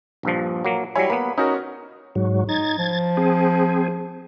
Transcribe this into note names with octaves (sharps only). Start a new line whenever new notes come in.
A#1 G2 F3
F#3 A#3
F#3 G3 E4 C#5 G#5 B5
A#3 B3 B5
C#4 D#4 F#4 A#4
G#2 F#3
D#4 G#6 A6
F3
C4 G#4